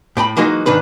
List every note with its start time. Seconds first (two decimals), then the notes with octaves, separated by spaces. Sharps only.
0.17 A2 G5 A#5 B5
0.37 E3 F#3 G#3 A#3 D#4 F#4
0.66 G#2 D#3 D4 B4